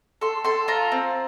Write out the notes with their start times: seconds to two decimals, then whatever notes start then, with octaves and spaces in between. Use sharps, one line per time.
0.21 A4 C6
0.44 A4 C6
0.68 F4 A#5
0.92 C4